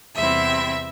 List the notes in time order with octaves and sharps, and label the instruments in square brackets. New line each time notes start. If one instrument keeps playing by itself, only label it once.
[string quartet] E2 C3 G3 C4 E4 E5